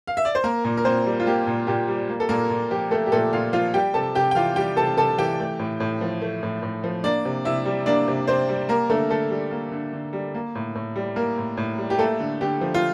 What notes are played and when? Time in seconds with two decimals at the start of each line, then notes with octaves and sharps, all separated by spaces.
0.07 F5
0.17 E5
0.25 D5
0.35 C5
0.44 A#3 A#4
0.64 A#2
0.77 A#4
0.85 A#2 C4 C5
1.06 G3
1.20 F4
1.26 A#3 G4
1.47 A#2
1.67 A#2 G4
1.88 G3
2.09 A#3
2.20 A4
2.29 A#2 A#3 A#4
2.50 A#2
2.71 F3 G4
2.91 A3 A#3 A4
3.06 G4
3.12 A#2 A3 A4
3.33 A#2 F4 F5
3.53 F3 F4 F5
3.74 G3 G4 G5
3.94 C3 A4 A5
4.15 C3 G4 G5
4.31 G5
4.35 E3 F4 F5
4.56 G3 G4 G5
4.76 C3 A4 A5
4.97 C3 A4 A5
5.18 E3 G4 G5
5.39 A3
5.59 A2
5.80 A2
6.01 F3
6.22 A3
6.43 A2
6.63 A2
6.84 F3
7.03 A#3 D4 D5
7.25 C3
7.45 C3 E4 E5
7.65 G3
7.86 A#3 D4 D5
8.08 C3
8.27 C3 C4 C5
8.49 G3
8.69 A#3 A#4
8.89 D3 A3 A4
9.10 D3 A3 A4
9.30 G3
9.51 A#3
9.72 D3
9.93 D3
10.13 G3
10.34 A#3
10.55 A2
10.75 A2
10.96 G3
11.16 A#3 A#4
11.38 A2
11.57 A2
11.78 G3
11.90 G4
11.99 A3 A#3 A4
12.20 D3
12.41 D3 G4
12.61 F3
12.74 F4